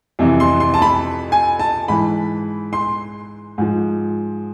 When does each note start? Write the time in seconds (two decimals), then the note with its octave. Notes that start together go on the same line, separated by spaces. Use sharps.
0.19 F2 C3 E3
0.40 C6
0.60 C6
0.74 A5
0.82 B5
1.32 G#5
1.59 A5
1.88 G#2 E3 B5
2.73 C6
3.58 G#2 F3